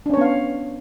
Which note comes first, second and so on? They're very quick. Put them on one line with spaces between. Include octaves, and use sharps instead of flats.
D4 C#4 C#5 B3 F5